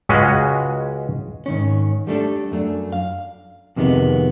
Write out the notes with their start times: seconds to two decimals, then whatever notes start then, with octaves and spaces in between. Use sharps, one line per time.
0.09 C#2 G#3 C#4 F#4 D#5
1.46 G#2 D#3 C#4
2.07 G3 A3 D4 A4
2.52 F#2 A3 D4
2.92 F5
3.76 F2 C3 D#3 G#3 B3